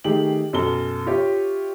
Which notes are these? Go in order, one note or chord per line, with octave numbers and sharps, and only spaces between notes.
D#3 A3 G4 G#4 G5 F#7
F#2 B2 A4 A5 G7
F4 G4 C#5 E5